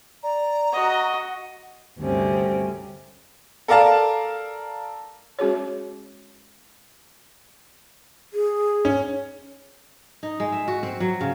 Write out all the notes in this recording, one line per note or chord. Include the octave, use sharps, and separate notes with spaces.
D5 A#5
F#4 D#5 F#5
D2 G2 C3 C4 C#4
A4 A#4 D5 F5 A5
G#3 C#4 F#4 G#4 C#5
G#4
C#4
D#4
G#3
E5
F#4
C4
F#3
C#3